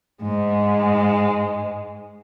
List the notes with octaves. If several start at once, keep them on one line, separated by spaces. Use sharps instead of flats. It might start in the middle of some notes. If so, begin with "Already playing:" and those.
G#2 G#3